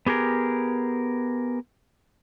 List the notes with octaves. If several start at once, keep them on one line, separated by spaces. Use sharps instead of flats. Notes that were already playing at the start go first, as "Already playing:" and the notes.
B3 G4 G#4 A#4